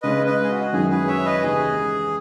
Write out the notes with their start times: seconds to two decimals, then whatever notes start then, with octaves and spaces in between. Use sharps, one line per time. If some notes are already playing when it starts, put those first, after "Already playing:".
0.03 C#3 G#3 C#4 B4 D#5
0.26 B4 D#5
0.43 G#4
0.50 F#4
0.73 F#2 D#3 F#3 C#4 E4 G#4
0.90 G#4 B4
1.07 C#5 E5
1.25 B4 D#5
1.43 D#2 C#3 E3 G#3 G#4